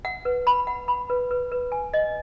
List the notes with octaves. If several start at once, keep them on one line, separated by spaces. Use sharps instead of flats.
F#5
B4
B5
F#5
B5
B4
B4
B4
G#5
D#5